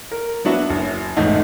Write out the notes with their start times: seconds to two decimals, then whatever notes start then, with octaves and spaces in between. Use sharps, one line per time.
0.11 A#4
0.45 F#3 B3 D4 F#4 E5
0.70 F#1
1.17 E1 A1 G#2 A3 D#4